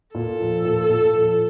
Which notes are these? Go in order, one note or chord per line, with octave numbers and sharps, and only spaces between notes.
A#2 A4
F3
A#2
A#2
F3